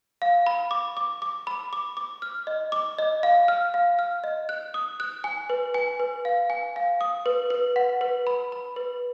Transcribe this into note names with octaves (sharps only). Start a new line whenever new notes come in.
F5
B5
D6
D6
D6
B5
D6
D6
F6
D#5
D6
D#5
F5
F6
F5
F6
D#5
F#6
D#6
F#6
G#5
B4
G#5
B4
F5
G#5
F5
D#6
B4
B4
F#5
B4
B5
B5
B4